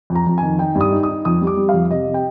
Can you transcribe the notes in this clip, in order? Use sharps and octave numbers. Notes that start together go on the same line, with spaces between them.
F2
A#5
F2
D#3 G#5
D#4 G5
G2
D#6
D#4
D#6
D#4
F2 D#6
G3
D6
G3
F2 F5
C3 D#5
C3
G5